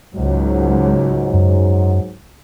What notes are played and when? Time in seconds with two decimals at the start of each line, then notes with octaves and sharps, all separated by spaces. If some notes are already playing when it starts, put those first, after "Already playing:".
0.15 C#2 G#2 F#3
1.33 F#2